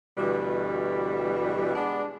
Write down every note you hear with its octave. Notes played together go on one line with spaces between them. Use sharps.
D2 B2 E3 G3
G#3 B3 D4